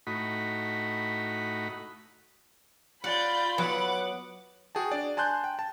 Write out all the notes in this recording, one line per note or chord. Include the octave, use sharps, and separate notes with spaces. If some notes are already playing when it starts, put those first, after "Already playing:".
A2 D#4 F#4 B5
F4 D5 F#5 B5 G6
F#3 B3 B4 F#5 D6
F#4 G#4 G5 A5
D4 D5
G#5 A5 C6 F#6 G6
G5
A5